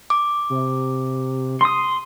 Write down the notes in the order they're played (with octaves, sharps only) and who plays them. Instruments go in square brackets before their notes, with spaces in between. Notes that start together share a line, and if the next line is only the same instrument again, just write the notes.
[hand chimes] D6
[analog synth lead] C3
[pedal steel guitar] C6 D#6